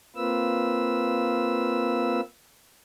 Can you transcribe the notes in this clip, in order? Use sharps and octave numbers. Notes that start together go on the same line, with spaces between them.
A#3 C4 F4 B4 E6